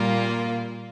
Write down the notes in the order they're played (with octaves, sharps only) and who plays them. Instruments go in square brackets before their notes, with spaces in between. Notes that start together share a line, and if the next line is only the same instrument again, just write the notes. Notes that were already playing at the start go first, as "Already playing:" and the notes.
Already playing: [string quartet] A#2 G3 A#3 F4 A#4